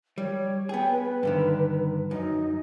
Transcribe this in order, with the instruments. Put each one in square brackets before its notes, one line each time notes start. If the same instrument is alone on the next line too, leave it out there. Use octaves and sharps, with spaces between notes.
[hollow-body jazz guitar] G3 [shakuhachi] C#5
[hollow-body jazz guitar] B3 G#4 [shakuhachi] G5
[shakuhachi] B4
[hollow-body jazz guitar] G2 D3 D#3
[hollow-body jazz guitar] F#2 [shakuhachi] D#4